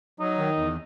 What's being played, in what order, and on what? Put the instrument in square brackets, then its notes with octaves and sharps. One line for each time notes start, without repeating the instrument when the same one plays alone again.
[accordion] F#3 [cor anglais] D#4
[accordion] D#3
E2